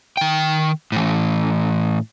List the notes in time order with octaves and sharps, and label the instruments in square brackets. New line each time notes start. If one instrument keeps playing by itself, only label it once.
[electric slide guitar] D#3 G5
A2 E3